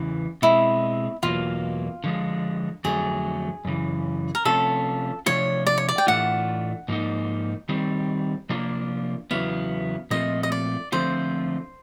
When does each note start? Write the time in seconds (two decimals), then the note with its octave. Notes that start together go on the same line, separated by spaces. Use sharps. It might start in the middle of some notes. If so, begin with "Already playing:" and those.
Already playing: E2 C#3 E3
0.42 B2 G#3 C4 E4
1.23 E2 B2 F#3 A#3 F4
2.04 D3 F3 G#3
2.84 F2 D3 F#3 A3 G#4
3.65 F#2 C#3 E3
4.35 A#4
4.45 C3 F3 A3 C#4 F4 A4
5.26 C3 F3 A3 D4 F4 C#5
5.67 D5
5.78 C#5
5.89 D5
5.98 G5
6.07 A2 E3 A3 D4 F4 F#5
6.88 G#2 F3 A#3 D#4
7.69 D#3 G3 C4
8.50 C3 F3 A#3 D4 F4
9.31 E2 C#3 F#3 B3 E4 F5
10.11 A#2 F3 A3 C4 F4 D#5
10.43 D#5
10.52 D5
10.92 D3 F3 A3 C4 F4 C5